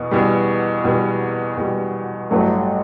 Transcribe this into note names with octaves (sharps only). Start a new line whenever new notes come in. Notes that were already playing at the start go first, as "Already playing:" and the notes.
Already playing: E2 B2
E2 B2 G3
E2 B2 G3
E2 B2 G3
A1 G2 F#3 A3